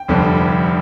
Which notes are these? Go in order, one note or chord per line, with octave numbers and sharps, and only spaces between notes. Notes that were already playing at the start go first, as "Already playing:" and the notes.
Already playing: G5
F1 F2 D3 G3